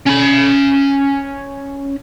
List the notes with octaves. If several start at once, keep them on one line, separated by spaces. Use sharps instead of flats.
C#4 B5